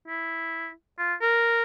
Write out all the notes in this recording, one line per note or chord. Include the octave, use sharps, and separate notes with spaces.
E4
F4
A#4